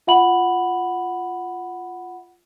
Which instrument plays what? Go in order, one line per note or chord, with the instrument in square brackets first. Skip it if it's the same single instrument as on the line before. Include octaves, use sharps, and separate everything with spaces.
[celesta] F4 E5 F#5 B5 F#7